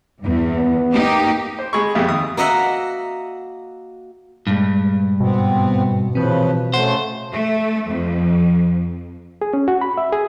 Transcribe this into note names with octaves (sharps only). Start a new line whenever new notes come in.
E2 G2
B3
A#3 D#4 G4
C5
G#3 G#4 B5 C#6
F2 B2 G4 G#4 E5 F5
D#2 D#6
A#3 F#4 D#5 E5 F#5
G2 A#2 G#3
G#2 B2 B3 C4
A#2 C#3 E3 F3 C4 B4
C#3 A3 C5 F#5
A3
F2
G#4
C#4
F#4
B5
E5
G#4